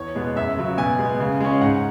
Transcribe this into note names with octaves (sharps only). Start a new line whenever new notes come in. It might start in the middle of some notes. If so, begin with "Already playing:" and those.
Already playing: E2 C#5
B2 G#3 B3
F#2 E5
C#3 F#3
B2 G#5
G#3 B3
C#3
G#3 C#4
G#2 F#5